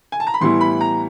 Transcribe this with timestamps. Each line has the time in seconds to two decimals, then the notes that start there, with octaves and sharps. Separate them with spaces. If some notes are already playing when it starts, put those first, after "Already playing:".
0.12 G#5
0.20 A5
0.27 A#5
0.34 B5
0.41 A2 E3 G3 B3 E4 C6
0.61 B5
0.81 A#5